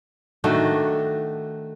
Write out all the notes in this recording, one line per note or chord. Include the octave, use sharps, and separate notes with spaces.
D#3 A3 D4 F#4